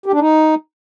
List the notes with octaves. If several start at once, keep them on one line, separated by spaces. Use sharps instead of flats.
G4
D4
D#4